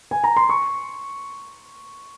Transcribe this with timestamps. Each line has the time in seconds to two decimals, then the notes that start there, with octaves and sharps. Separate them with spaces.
0.11 G#5
0.24 A#5
0.37 C6
0.49 C#6